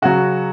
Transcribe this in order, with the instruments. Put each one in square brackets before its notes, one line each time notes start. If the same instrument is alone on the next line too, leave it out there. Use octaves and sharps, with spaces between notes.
[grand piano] C#3 F#3 F#4